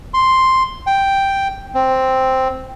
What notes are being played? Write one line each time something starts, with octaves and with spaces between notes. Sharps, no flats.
C6
G5
C4